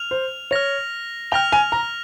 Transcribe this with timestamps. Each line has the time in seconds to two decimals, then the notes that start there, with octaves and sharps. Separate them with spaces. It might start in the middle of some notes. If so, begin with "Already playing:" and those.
Already playing: F6 F7
0.11 C5
0.51 C#5 F6 A#6 F7
1.32 G5 F6 A#6 F7
1.52 G#5
1.72 A#5